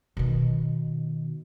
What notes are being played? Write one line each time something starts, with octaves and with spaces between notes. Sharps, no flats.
B2 D#3